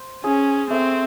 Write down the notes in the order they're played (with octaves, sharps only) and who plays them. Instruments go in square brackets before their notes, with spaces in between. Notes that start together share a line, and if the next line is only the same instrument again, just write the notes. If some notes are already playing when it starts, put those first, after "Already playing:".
Already playing: [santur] C5
[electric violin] C#4 [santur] G#4
[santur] A3 [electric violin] C4